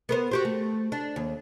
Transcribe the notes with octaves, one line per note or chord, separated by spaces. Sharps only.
B3 A#4 C5
F#4 G4 C5
A3
D4
D#2